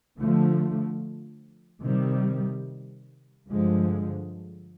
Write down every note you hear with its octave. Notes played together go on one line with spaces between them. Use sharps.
D3 F3 A3
C3 D#3 G3
G2 D3 F3 G#3